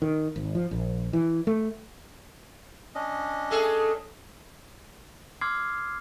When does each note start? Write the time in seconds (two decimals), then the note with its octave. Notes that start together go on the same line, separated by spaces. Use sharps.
0.02 D#3
0.36 G#1
0.55 F3
0.71 A#1
1.13 E3
1.47 A3
2.95 C#4 D4 D#5
3.50 A3 G#4 A4
5.41 C6 D6 E6 F6 G#6 C7